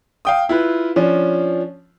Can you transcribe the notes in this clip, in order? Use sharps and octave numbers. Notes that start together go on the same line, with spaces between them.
F5 G5 D#6
E4 F4 B4
F3 C#4 D4